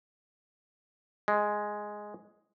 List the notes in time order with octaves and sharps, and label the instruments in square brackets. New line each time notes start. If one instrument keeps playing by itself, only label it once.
[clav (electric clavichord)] G#3